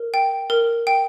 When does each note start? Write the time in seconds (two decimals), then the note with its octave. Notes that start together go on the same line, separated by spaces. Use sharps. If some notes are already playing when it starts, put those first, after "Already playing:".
Already playing: A#4
0.14 G5
0.50 A#4
0.87 G5